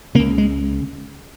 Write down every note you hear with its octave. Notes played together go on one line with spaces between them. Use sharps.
C#2 C#3 A#3
G#3